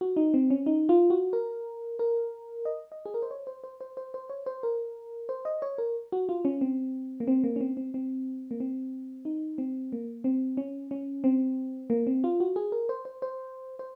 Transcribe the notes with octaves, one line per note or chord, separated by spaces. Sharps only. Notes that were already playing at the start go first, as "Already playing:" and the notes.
F#4
D#4
C4
C#4
D#4
F4
F#4
A#4
A#4
D#5
D#5
G#4
A#4
C5
C#5
C5
C5
C5
C5
C5
C#5
C5
A#4
C5
D#5
C#5
A#4
F#4
F4
C#4
C4
A#3
C4
A#3
C#4
C4
C4
C4
A#3
C4
D#4
C4
A#3
C4
C#4
C#4
C4
A#3
C4
F4
F#4
G#4
A#4
C5
C5
C5
C5